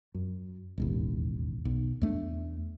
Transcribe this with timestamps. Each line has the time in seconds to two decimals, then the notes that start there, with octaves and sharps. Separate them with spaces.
0.14 F#2
0.78 E1 A1 D#2
1.65 B1
2.02 E2 A3 D4